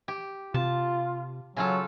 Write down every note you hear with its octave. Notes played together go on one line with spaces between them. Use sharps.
G4
C3 F4 A5
C#3 F#3 F4 A4